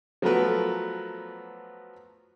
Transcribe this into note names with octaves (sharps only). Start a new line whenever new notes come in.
F3 F#3 A3 B3 A#4 B4